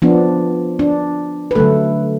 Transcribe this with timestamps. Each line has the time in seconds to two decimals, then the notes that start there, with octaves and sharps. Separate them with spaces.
0.02 F3 B3 D4
0.79 D4
1.51 B4
1.55 D3 F#3 A3 A4